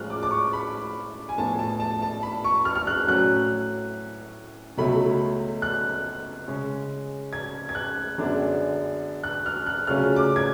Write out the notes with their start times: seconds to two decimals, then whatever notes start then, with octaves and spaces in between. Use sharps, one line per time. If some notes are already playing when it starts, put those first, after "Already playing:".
Already playing: A2 F3 G#3 C#4 F4 F6 F#6
0.10 D6
0.23 D6
0.31 C#6
0.53 B5
1.29 G#5
1.38 A2 F3 B3 A5
1.59 A5
1.80 A5
2.02 A5
2.23 B5
2.44 C#6
2.65 F6
2.75 F6
2.87 F#6
3.07 A2 F#3 C#4 F#6
4.77 C#2 B2 F#3 A3 B5
5.62 F#6
6.48 C#3 G#3 C#4
7.33 G#6
7.69 G#6
7.75 F#6
8.18 F#2 D3 G#3 B3 D4
9.23 F#6
9.46 F6
9.66 F#6
9.87 C#3 F#3 A3 C#4 F4 F6
10.16 D6
10.36 G#6